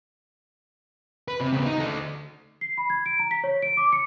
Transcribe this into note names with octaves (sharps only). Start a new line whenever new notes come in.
B4
C3
C#3 B3
D#4
D2 A4
C7
B5
G#6
D7
A#5
B6
C#5
D7
D6
C#7